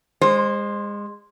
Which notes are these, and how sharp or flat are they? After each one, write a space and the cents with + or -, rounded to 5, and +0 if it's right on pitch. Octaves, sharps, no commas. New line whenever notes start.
G#3 -25 C5 +10